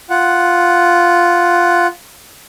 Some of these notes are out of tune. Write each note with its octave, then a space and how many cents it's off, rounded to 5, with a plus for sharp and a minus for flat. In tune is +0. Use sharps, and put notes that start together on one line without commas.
F4 +0 F#5 +0